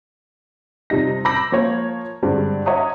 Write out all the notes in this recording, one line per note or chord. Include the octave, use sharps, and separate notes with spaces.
F2 C3 G3 D#4 A#6
B5 D6 E6 G6 A#6
F3 A#3 F4 C#5
G2 D3 G#3 C4 D4
C#5 D#5 E5 F#5 A#5 D#6